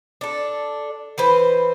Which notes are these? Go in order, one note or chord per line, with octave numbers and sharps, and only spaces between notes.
D4 A4
E3 B4 C5